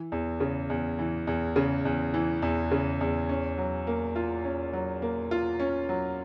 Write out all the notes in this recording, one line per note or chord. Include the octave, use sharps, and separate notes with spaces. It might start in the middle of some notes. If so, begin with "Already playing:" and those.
Already playing: E3
E2
C#3
E2
E3
E2
C#3
E2
E3
E2
C#3
E2
C#4
F#3
A#3
F4
C#4
F#3
A#3
F4
C#4
F#3